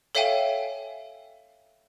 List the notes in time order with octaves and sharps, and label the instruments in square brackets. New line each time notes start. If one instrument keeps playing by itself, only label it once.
[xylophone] A4 C#5 E5 F5 G5 G#5